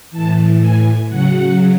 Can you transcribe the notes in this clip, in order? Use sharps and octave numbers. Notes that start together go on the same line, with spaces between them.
A2 E3 A5
G#5
C#3 F#3 F#5